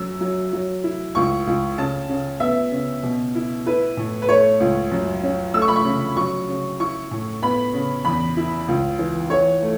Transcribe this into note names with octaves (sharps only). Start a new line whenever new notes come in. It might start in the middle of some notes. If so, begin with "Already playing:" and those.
Already playing: F#2 F#3 E6
F#3
F#3
E4
C#2 C#6
C#2
C#3 A5
C#3
B3 E5
C#3
B2
E4
E4 B4
A2
B4
A3 C#5
C#2
F#2
C#4
A3 E6
C#6
B5
C#6
C#3
F#3 C#6
C#3
E4 C#6
A2
B3 B5
C#3
E2 B5
E4
C#2
E3
E3 C#5
A3